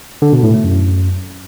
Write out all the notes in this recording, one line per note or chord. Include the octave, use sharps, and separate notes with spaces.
D3
B2
A2
A3
F#2